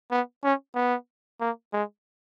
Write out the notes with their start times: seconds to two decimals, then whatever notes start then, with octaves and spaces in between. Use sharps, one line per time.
0.11 B3
0.44 C#4
0.75 B3
1.41 A#3
1.73 G#3